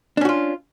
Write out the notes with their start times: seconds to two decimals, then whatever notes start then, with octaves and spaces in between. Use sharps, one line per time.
0.17 D4
0.21 C#4
0.25 F#4
0.29 F4